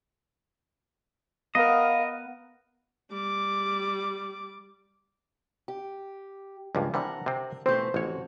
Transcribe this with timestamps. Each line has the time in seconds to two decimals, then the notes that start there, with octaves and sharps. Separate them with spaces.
1.55 B3 A#4 D#5 F5
3.11 G3 D6
5.68 G4
6.75 C#2 G2 F3 A#3
6.94 C3 E3 G3 D4 A#4 F#5
7.26 C3 C4
7.66 B2 E3 A3 C4 C5
7.94 A1 F2 F#4 C#5